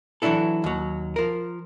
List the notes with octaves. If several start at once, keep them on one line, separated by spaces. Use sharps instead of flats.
E3 F#3 G#3 D4 E4 A4
D#2 F#3
F3 A#4